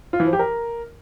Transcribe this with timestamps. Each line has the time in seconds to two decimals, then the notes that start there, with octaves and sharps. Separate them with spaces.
0.13 F4
0.20 E3
0.26 F3
0.33 G4
0.39 A#4